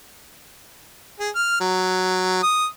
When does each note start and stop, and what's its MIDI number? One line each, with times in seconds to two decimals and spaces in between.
1.20 1.30 68
1.35 1.61 89
1.61 2.42 54
2.43 2.66 87